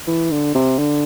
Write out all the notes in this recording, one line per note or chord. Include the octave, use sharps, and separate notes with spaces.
E3
D3
C3
D3